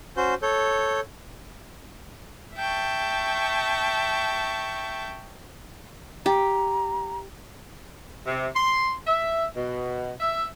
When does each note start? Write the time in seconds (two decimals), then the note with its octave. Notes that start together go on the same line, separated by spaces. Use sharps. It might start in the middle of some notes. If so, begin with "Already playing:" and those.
0.17 C#4 F#4 C5 G6
0.42 A4 C#5 G6
2.56 E5 G5 A5 C#6
6.26 G4 A#5
8.26 C3
8.55 C6
9.07 E5
9.56 B2
10.20 E5